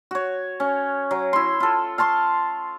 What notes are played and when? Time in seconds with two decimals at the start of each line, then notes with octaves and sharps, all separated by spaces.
0.11 F#4 C#5
0.60 C#4
1.11 F#3
1.33 E4 C6
1.60 F4 A4
1.98 F5 A5 C6 C#6